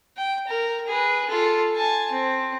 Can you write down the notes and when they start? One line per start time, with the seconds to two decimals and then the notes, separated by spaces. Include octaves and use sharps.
0.17 G5
0.47 A#4
0.87 G#4 B4
1.29 F4 A4
1.75 G#5 A5
2.12 C4